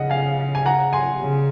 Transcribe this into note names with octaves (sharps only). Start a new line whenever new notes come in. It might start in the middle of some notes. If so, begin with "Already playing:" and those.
Already playing: C#3 D#5 F#5
F5 G#5
G#5
F#5 A#5
G#5 C6
C#3